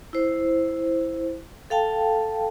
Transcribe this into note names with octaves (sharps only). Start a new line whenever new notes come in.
E4 C5
A4 F5 G5 A5